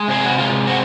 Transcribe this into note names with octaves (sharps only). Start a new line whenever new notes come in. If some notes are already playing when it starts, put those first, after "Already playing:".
Already playing: G#3
C3 G#4
F#4
G#3 F4
C4 F#4